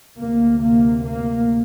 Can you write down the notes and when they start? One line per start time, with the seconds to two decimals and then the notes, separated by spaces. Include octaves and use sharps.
0.17 D2 C3 A#3
0.61 A#3
1.05 A#3